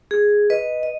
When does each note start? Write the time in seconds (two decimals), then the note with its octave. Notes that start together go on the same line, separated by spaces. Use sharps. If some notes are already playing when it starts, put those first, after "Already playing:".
0.11 G#4
0.50 B4 D#5
0.83 D#5